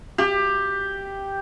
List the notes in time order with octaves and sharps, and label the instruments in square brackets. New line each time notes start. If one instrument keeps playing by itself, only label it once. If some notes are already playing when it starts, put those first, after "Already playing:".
[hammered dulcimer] G4